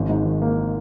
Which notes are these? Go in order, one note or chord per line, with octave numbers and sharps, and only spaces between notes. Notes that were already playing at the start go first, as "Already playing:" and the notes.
Already playing: G#1 C#4
G#2
D#3
A#3